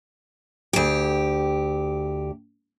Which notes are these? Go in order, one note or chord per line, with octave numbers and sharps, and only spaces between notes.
D2 G4